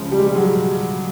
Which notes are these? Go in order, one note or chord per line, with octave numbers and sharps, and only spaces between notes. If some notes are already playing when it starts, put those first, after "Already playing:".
Already playing: C#2 C#3 F3 G#3
G3
G#3
G3
F#3